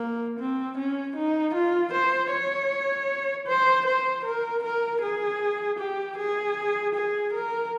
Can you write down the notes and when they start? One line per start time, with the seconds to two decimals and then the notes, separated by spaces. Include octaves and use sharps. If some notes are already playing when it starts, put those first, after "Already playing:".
Already playing: A#3
0.39 C4
0.78 C#4
1.16 D#4
1.55 F4
1.93 C5
2.32 C#5
3.47 C5
3.86 C5
4.24 A#4
4.63 A#4
5.02 G#4
5.79 G4
6.17 G#4
6.95 G#4
7.33 A#4